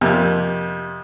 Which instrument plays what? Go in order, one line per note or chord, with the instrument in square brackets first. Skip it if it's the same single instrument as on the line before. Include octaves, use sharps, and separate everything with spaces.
[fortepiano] F2 C3 A#3